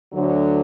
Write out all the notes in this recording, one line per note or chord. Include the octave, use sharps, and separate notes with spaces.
D2 D3 F#3